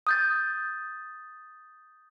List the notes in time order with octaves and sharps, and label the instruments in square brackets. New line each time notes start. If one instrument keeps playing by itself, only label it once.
[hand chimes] D#6 G6 A6